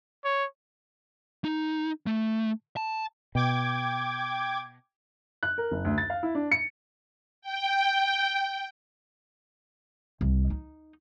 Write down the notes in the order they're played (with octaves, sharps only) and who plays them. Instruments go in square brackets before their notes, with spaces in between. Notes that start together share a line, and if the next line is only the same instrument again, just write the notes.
[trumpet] C#5
[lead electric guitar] D#4
A3
A5
[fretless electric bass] B2 [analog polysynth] G5 D6 G#6
[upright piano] F#6
A#4
F#1
D2
A6
F5
E4
D4
C#7
[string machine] G5
[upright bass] C2
D#4